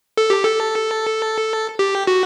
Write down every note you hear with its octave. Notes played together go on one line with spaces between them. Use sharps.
A4
G4
A4
G4
F#4